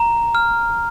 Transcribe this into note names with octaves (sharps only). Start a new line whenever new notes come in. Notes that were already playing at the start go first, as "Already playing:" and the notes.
Already playing: A#5
F6